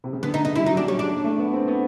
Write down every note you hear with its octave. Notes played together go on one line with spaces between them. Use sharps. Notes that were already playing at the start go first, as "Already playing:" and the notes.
C3
C#3
D3 B3
D#4
C#3 D#4
G3 E4
F#3 D#4
G3 D4
G3 C#4
G#3 D4
A3
B3
C4
B3